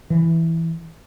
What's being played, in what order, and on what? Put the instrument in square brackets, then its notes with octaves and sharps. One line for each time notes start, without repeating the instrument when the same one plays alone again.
[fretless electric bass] E3